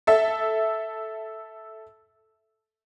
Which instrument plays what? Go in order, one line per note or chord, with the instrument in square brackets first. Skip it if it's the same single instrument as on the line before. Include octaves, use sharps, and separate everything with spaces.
[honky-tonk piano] A4 E5